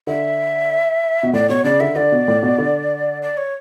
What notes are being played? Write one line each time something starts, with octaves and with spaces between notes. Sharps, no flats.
D3 E5
B2
A2 D5
B2 C#5
C#3 D5
D3 E5
D3 D5
B2
A2
B2
D3
D5
C#5